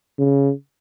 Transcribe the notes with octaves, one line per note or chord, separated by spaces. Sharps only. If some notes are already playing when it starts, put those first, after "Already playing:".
C#3